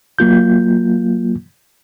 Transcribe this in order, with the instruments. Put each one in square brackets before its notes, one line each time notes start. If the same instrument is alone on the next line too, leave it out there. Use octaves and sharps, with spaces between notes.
[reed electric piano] F#3 A#3 F4 G6